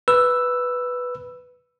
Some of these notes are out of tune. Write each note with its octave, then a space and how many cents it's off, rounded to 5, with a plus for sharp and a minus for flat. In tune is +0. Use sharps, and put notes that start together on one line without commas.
B4 +0 E6 +5